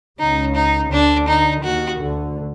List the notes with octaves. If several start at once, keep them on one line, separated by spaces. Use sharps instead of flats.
C#2 C#3 D#4
D#4
D2 D3 D4
D#4
D#2 D#3 F#4
D2 D3